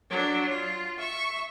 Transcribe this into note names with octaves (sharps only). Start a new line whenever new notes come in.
F#3 D4
F4
E5 C#6